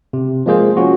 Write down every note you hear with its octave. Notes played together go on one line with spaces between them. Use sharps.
C3
F3 G#3 A#3 G#4 C5
C#4 F4 F#4